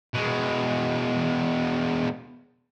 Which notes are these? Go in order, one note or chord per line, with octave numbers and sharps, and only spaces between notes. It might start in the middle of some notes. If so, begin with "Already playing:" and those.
B2 G#3